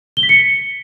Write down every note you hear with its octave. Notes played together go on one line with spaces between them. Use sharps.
G7
B6
C#7